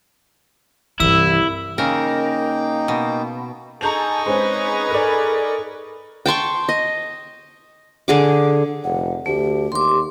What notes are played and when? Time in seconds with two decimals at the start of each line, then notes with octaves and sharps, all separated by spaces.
1.00 C2 G2 E3 E4 E6
1.78 C#3 A#3 D#4 A#4 G5
2.88 B2
3.81 D#4 G#4 A4 A5 A#5 C#6 G6 F7
4.26 G#3 C4 C#4 G#4 B4 C5
4.91 A4 A#4 D5
6.26 G5 A5 C6 C#6
6.69 D#5
8.08 D3 G#4 D6
8.84 F1 F#5
9.26 D2 A3 G4
9.72 D#2 C6 D6